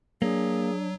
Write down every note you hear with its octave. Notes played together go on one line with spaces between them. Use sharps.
F#3 A#3 D4 G#4